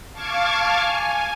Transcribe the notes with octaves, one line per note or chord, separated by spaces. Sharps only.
F5 A5 C#6 D6 F6 G#6
G#5